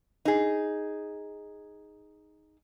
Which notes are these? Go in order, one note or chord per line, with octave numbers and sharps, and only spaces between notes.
D#4 G#4